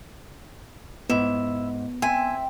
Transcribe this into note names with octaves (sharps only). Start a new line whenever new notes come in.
G#2 B3 E4
C4 E5 G5 G#5 C6